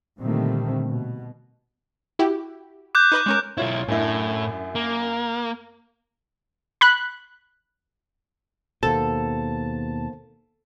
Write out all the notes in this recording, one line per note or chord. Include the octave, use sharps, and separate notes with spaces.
A#2 D3 D#3 G3 A3 C4
B2
E4 F#4 G4
D6 F#6 G6
D#4 B4 D#5
G#3 C#4 A#4
B1 E4 F4 C#5
F#2 A2 D4 E4
A#3
B5 F#6
D#2 B2 A#3 B3 A4 C5 A5